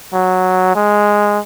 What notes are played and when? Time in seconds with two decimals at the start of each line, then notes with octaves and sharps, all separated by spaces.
0.13 F#3
0.75 G#3